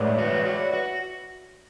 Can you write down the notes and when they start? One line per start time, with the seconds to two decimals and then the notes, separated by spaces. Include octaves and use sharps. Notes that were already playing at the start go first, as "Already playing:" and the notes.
Already playing: A2 G#3 B4 C#5 D5 E5 F#5
0.11 D5
0.18 F#4
0.32 E5
0.45 F#4
0.52 D5
0.73 F#4 B4